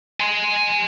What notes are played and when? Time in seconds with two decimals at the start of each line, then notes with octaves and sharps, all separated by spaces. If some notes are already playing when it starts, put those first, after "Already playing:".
0.20 G#5 C6